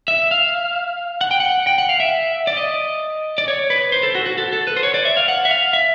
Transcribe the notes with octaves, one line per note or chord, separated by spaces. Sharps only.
E5
F5
F#5
G5
F#5
G5
F#5
F5
E5
D5
D#5
D5
C#5
B4
C5
A4
F#4
F#4
A4
A4
B4
C5
C#5
D5
E5
F5
F#5
E5
F5
E5